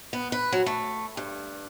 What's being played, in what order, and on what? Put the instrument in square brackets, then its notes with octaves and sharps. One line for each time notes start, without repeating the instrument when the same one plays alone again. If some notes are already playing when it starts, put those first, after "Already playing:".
[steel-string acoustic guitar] B3
B4
F#3
A3
G2